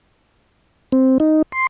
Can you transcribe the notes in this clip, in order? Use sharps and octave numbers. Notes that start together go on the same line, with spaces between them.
C4
D#4
C6